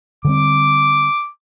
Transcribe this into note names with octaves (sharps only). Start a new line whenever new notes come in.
D3 G3 C4 D6